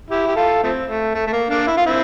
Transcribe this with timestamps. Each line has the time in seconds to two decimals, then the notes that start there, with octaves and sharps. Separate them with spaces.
0.10 E4 G4
0.27 G4
0.36 F4 A4
0.63 F3 A3 C4
0.89 A3
1.15 A3
1.27 A3
1.33 A#3
1.49 A#3 D4
1.67 E4
1.77 F4
1.86 C4 E4